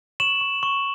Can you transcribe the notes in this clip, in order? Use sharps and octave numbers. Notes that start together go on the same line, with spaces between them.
C#6 E7 F#7
C#6
C#6